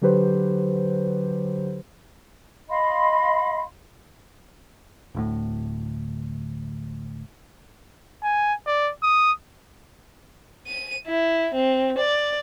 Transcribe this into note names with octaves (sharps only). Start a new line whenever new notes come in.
D3 F#3 G4 B4 C5
D#5 F5 B5 C6
D1 D2 A2
G#5
D5
D#6
D#7
E4
C4
D5